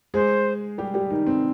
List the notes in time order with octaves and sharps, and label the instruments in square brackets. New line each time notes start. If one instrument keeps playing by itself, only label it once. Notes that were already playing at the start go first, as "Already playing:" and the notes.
[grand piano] G#3 G#4 [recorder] C5
[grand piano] G3 G4
G3 G4
D#3 D#4
C4